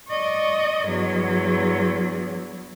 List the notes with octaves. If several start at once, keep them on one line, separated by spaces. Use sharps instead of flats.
D5 D#5 C#6
E2 G2 F#3